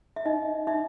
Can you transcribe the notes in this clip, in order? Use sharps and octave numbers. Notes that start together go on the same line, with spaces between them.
E5
D#4 D#5
D#4 E5